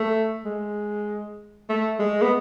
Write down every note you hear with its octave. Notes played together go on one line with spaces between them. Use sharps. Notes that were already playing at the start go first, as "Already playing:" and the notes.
Already playing: A3
G#3
A3
G#3
B3